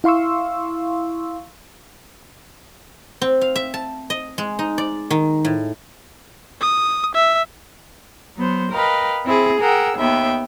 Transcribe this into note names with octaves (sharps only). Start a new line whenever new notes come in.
E4 F5 C6 C#6 E6
C4
F5
E5
A5
D#5
G#3
D#4
D5
D#3
A2
D#6
E5
F#3 B3 C5
A#4 B4 D#5 F5 G5
C4 E4 G#4
G#4 A#4 F#5 G5 E6
D#2 B3 E5 G5